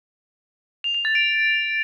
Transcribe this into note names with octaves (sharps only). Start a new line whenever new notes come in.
F7
F7
A6
D7